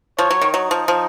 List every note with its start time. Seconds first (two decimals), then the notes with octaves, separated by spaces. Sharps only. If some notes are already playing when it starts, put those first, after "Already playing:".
0.19 F3 C#5
0.30 F#3
0.41 D#3
0.53 F#3 D#4
0.71 F3
0.88 F3